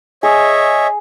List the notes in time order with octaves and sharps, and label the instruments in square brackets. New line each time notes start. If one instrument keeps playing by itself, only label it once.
[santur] G#4 [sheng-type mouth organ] C#5 D#5 E5